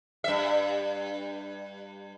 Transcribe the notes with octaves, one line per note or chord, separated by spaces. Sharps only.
G2 E5